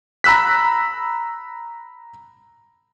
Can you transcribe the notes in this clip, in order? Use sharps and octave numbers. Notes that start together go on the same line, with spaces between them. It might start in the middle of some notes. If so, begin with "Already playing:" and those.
A#5 B5 E6 F#6 B6